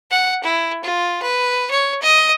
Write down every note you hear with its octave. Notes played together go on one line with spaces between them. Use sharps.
F#5
E4
F4
B4
C#5
D#5